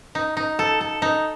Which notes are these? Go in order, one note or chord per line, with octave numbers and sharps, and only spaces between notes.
D#4
D#4
A4
A4
D#4